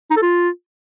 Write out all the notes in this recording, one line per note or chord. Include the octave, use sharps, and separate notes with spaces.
D#4
A4
F4